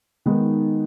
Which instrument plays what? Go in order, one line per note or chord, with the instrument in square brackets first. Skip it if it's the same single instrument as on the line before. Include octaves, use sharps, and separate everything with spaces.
[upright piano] D#3 G#3 B3 D#4